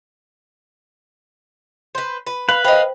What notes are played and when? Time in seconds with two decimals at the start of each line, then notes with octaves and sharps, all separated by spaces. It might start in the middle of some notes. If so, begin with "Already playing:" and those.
1.95 B4 C5
2.27 B4
2.49 B4 F5
2.65 C5 D#5 F5 G5 B5